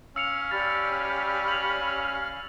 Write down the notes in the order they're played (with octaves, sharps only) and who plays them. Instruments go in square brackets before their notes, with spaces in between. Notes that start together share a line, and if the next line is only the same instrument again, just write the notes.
[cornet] C#4 [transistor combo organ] F5 [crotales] E6 C#7 F7
[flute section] G4 D5 B5 [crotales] A6
[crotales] F7 F#7